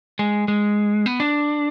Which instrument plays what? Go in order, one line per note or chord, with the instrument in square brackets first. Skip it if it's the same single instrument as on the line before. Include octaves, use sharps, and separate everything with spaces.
[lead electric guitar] G#3
G#3
B3
D4